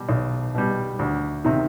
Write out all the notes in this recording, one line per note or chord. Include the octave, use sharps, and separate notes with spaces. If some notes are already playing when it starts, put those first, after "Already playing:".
Already playing: B2 G3
B1
B2 G3
D2
C3 D#3